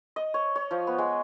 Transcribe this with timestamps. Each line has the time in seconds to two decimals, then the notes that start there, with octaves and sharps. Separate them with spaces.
0.16 D#5
0.34 C#5
0.56 C#5
0.71 F3
0.87 B3
0.98 G#3